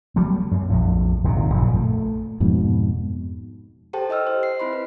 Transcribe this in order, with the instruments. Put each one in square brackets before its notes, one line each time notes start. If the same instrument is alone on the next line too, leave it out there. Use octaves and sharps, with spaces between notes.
[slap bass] F#3 G3 A3 B3
F#2
A#1 F2 A2
D#1 G#1 C3 D#3
A#1 F#2 A#2 C#3
A3
[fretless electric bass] F2 G#2 B2
[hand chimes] G4 A4 C5 G5 A5
E4 D#5 G5 E6 F6
C5
C7
C4 E4 B5 C6
B4